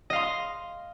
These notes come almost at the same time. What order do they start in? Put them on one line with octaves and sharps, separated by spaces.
D#5 F5 C6